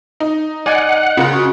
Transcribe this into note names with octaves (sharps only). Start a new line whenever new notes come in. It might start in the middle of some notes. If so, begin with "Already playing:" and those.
D#4
D5 D#5 F#5 G#5
C#3 F4 A#4
C#4 F#4